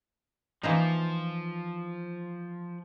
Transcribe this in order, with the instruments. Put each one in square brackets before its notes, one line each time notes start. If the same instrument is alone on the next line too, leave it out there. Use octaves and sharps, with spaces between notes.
[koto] E3 A#3 D#4 [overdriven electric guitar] F3